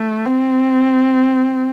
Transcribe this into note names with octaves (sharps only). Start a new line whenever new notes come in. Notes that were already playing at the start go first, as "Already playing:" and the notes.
Already playing: A3
C4